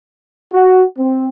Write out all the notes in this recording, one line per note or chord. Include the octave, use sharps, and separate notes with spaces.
F#4
C4